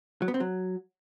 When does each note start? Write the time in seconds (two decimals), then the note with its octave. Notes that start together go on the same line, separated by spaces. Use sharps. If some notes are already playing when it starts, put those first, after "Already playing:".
0.22 F#3
0.28 B3
0.34 C4
0.40 F#3